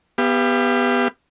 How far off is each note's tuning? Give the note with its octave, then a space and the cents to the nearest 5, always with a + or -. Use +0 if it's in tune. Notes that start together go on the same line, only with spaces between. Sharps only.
B3 +0 G4 +25 F5 -35